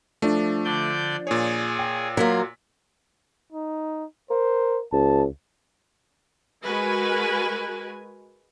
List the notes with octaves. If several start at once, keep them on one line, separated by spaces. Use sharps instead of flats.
F3 A3 D4
D3 D5 G6
A#2 G#4 C#5
G5
F#3 A#3 F4 B6
D#4
A#4 C5
C#2 A5
G#3 F#4 A#4 B4 G#5